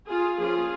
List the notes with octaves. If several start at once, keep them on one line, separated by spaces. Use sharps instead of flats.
F4 G#4
F3 A#3 C#4 F4 G#4